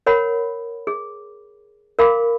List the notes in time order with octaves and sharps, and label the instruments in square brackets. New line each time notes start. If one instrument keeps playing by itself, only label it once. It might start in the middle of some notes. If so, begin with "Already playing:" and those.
[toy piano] A#4 C#5 F#5 B5
G#4
A#4 F5 B5 D6